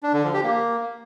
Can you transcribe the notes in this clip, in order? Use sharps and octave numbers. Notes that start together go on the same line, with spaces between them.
D4
D3
F3
G4
A#3